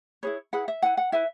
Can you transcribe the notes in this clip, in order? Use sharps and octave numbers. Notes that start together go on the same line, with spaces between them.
E4 G#4 B4 C#5
E4 G#4 B4 F#5
E5
E4 B4 F#5
F#5
E4 B4 E5